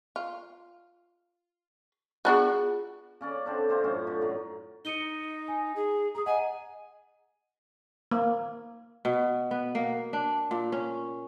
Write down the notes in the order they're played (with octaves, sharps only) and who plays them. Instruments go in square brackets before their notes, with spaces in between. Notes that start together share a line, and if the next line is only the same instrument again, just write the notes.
[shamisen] F4
[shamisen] B3 D4 F#4 [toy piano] F4 G#4
[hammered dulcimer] C#3 C#4 D5
D3 C4 D4
C3 C4 F4 C5
F#2 A2 C#4
D3
A2 F#3
[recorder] D#4 [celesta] C#7 D#7 G7
[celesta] G#5
[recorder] G#4
[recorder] G#4 [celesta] A#5 D#6
[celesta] D#5 F#5 [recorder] G#5
[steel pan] A#3
[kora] B2
B3
A#3
D4
A#2
C#4